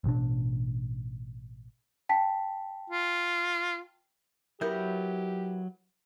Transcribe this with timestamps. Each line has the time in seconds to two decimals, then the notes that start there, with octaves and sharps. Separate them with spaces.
0.04 A1 B2 D4
2.09 G5 A5 B6
2.90 F4
4.61 F#3 B3 E4 G4 A#4 G6